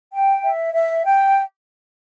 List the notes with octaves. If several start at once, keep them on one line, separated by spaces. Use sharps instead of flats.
G5
E5
E5
G5